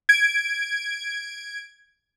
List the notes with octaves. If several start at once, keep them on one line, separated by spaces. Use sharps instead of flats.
G#6 D7